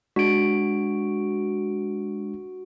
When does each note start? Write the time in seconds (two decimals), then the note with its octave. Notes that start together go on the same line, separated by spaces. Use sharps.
0.16 G#3 D4 F#4 D7